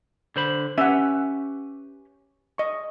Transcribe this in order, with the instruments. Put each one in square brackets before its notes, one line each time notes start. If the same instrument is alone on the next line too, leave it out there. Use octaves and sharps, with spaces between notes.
[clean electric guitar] D3 C5 B5
[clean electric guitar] C#4 G4 B4 [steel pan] E5 F#5
[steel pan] D#5 C#6